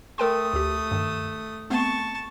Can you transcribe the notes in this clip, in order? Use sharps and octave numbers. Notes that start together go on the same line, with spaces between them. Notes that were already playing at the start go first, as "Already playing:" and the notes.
A3 A#4 G5 C6 D#6
D2 G4
G2 D#3
A3 B3 C4 A5 C#6